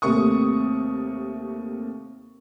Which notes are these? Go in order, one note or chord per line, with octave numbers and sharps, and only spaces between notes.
D#2 C3 A3 A#4 C#6 D#6